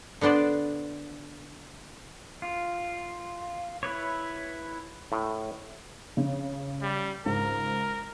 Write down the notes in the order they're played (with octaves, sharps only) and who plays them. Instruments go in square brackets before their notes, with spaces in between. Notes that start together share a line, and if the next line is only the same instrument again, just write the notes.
[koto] D3 B3 D4 C5 D5
[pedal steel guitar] F4
E4 B4 C#5
[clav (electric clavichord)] A2
[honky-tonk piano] C#3
[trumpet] G3
[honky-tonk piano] C#2 G#2 [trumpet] A#4